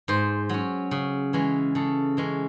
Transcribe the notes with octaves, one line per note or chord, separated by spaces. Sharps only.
G#2 C5
F#3 C#4
C#3
E3 G#3 C#4
C#3 A4
E3 G#3 C#4